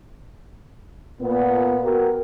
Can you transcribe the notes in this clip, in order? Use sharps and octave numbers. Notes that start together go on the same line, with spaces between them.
A#2 B3
F#4 G4 A#4